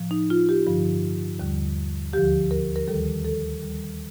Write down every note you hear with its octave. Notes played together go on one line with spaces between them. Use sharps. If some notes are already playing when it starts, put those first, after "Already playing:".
Already playing: A2 F3
D#4
F4
G4
G2 D3 F3
D#2 D3 G3
D2 D3 F3 G4
A#4
A#4
D#2 D#3 G3 A4
A4
D#2 D#3 G3